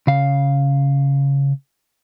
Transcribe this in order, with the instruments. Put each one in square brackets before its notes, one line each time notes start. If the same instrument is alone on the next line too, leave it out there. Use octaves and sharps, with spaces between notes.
[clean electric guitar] C#3 F5